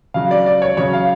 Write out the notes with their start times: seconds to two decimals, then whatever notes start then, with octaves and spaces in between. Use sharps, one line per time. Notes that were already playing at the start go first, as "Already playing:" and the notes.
0.14 C#3 F#3 F5
0.31 D5
0.46 D5
0.62 C#5
0.77 C#3 F#3 C#5
0.93 F5